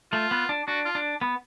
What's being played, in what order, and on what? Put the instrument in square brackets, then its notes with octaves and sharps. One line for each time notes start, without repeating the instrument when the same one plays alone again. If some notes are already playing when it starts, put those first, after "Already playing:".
[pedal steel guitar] A3 [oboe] F4
[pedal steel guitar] B3
D4
[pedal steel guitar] D4 [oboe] F#4
[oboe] F4
[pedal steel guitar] D4
B3